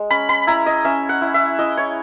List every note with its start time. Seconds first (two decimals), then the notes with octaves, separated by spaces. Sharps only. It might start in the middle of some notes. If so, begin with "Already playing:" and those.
Already playing: G#3
0.10 C#4 B5
0.29 B5
0.47 E4 A#5
0.66 D#5
0.85 C#4 E5
1.09 F#5
1.21 E4
1.34 E5
1.59 E4 D#5
1.77 C#5